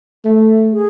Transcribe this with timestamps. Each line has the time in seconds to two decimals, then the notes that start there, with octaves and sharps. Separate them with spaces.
0.25 A3
0.74 G#4